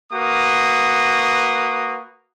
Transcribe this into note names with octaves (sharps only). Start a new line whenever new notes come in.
A#3 F#4 B4 D#6